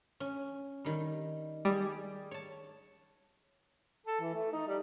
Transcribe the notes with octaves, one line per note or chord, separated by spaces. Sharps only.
C#4
D#3 G3
G3 G#4
C#5 A5
A4
E3
A3
D#4
G3